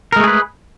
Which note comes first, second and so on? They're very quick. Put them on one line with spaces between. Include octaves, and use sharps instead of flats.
A#4 G#3 A3 G#4 B4